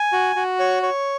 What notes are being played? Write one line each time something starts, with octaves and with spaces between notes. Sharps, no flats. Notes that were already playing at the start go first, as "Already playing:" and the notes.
Already playing: G#5
F#4
F#4
C#5
C#5